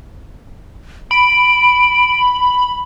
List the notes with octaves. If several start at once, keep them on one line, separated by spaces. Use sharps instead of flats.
B5 D7